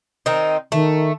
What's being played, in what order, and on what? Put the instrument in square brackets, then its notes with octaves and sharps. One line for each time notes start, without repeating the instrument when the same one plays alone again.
[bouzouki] D#3 C4 D#4
[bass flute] D#3 [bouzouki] A3